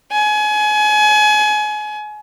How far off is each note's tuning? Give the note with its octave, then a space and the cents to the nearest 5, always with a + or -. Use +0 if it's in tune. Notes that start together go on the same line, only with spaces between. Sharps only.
G#5 +30